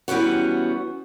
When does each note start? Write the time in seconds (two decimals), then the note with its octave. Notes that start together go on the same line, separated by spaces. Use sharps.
0.08 E3 G3 B3 C#4 F#4